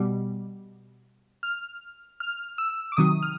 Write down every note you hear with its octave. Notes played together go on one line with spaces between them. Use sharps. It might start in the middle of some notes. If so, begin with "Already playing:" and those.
Already playing: B2 G3
F6
F6
E6
D6
C3 D#3 F#3 D#6
F6